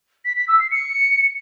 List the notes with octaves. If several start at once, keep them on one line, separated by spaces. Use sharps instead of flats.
B6
B6
E6
C7
C#7